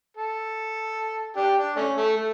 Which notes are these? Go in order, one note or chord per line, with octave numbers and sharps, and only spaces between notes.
A4
D4 G4
D4
A3 C#4
A3
A3